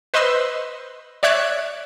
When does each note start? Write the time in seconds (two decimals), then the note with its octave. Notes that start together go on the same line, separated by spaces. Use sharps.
0.14 B4 C5 D#5 B5 C6 E6
1.23 C#5 D5 E5 F#6 G#6